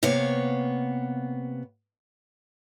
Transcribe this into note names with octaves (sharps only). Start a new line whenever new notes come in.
C3 A#3 B3 C#5 F5